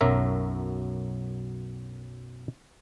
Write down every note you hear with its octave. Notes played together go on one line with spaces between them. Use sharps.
B1 F#2 F#3 A#4 E5